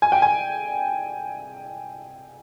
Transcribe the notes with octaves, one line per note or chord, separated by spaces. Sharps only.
G#5
G5
G#5